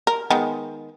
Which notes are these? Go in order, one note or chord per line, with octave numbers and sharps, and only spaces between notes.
A#4
D#3 G#3 B3